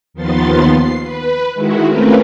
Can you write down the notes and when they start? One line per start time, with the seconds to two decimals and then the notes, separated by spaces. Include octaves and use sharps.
0.14 D#2 D#3 F3 B3 C6 A6
0.71 C7
1.02 B4
1.53 D#3 G#3 E4 F#4
1.86 A3 C4 C#4 F4 A#4 B4